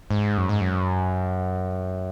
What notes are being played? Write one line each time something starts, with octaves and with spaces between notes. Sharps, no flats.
G#2
F#2
G#2
F#2